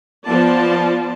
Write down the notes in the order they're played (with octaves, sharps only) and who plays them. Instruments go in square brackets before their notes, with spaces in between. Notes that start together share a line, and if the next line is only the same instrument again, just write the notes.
[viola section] F3 B3 F4 D5 A5